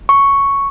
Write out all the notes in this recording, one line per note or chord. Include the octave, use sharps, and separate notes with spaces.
C#6